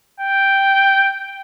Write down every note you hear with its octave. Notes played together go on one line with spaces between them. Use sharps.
G5